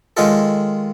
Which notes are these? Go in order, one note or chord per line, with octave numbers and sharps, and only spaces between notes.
D#3 G#3 C#4 F4 A4